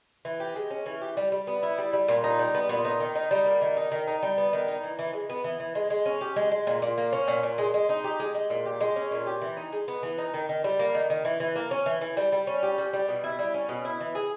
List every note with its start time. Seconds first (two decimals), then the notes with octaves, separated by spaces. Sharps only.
0.25 E3
0.40 G4
0.56 G#3
0.71 C#4
0.86 E3
1.02 G4
1.17 G3
1.32 G3
1.47 B3
1.63 E4
1.78 G3
1.93 G3
2.08 A#2
2.24 D#4
2.39 G3
2.55 B3
2.69 A#2
2.85 D#4
3.00 D#3
3.15 D#4
3.31 G3
3.46 A#3
3.62 D#3
3.77 D#4
3.92 D#3
4.07 D#4
4.23 G3
4.38 B3
4.53 D#3
4.68 D#4
4.83 E3
4.99 E3
5.13 G#3
5.30 B3
5.44 E3
5.60 E3
5.75 G#3
5.90 G#3
6.06 C#4
6.21 G4
6.36 G#3
6.52 G#3
6.67 A#2
6.82 A#2
6.98 A#3
7.13 C#4
7.28 A#2
7.43 A#2
7.58 G#3
7.74 G#3
7.89 D#4
8.04 G4
8.20 G#3
8.35 G#3
8.50 A#2
8.66 G4
8.81 G#3
8.96 C#4
9.11 A#2
9.27 G4
9.41 E3
9.57 D#4
9.72 G#3
9.88 B3
10.03 E3
10.18 D#4
10.34 D#3
10.49 D#3
10.64 G3
10.79 A#3
10.95 D#3
11.10 D#3
11.25 E3
11.40 E3
11.56 A#3
11.71 C#4
11.86 E3
12.01 E3
12.17 G3
12.32 G3
12.47 C#4
12.63 G4
12.78 G3
12.93 G3
13.08 B2
13.24 E4
13.39 G3
13.54 C#4
13.69 B2
13.85 E4
14.01 E3
14.15 G#4